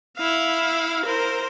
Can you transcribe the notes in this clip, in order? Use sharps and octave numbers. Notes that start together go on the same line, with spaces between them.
E4 F5
A#4 C5